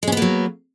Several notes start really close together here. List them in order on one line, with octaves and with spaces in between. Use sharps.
G#3 C#4 B3 A#3 F#3